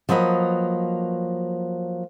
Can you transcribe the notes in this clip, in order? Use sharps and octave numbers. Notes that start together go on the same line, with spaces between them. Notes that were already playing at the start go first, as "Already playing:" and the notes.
F3 F#3 A#3 B4 D#5